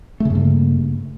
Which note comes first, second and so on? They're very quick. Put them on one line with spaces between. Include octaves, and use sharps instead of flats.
A3 C#3 G2 A#3